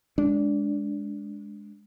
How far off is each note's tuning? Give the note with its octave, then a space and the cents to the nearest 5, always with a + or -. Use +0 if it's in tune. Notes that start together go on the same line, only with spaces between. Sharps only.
G#3 +0 D4 -15